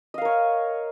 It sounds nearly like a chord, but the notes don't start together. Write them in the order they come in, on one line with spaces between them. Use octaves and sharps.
D#5 F5 A#4 C#5